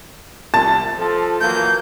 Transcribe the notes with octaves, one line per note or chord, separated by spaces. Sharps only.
C2 A5 A6
F3 F4 A4
E3 F#3 A#3 G6